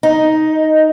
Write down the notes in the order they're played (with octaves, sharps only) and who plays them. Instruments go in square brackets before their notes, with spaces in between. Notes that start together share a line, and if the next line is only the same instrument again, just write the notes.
[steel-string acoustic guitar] D#4